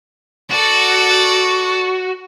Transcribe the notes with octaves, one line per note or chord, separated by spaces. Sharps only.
F#4 A4 D5